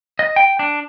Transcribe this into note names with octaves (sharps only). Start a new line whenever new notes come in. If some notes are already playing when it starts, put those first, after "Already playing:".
D#5
G5
D4